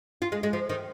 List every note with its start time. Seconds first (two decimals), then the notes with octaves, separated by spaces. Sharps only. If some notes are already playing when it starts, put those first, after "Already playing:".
0.22 F4
0.32 G#3
0.43 G#3
0.53 F3
0.69 D#3